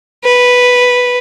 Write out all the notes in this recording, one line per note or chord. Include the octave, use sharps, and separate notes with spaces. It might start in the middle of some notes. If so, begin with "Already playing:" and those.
B4